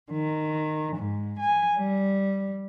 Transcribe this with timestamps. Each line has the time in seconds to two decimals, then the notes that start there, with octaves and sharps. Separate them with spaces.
0.11 D#3
0.94 G#2
1.39 G#5
1.76 G3